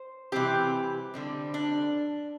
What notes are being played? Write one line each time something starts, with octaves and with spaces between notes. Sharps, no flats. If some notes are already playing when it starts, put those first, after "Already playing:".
Already playing: C5
C3 E3 G3 C4 G4
D3 G3 C4
D4